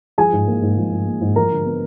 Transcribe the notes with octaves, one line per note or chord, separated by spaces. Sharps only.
F3 G#4 G#5
G#2
A#3
G#2
F3
G#2
A#3
G#2
F3 A#4 A#5
D3
B3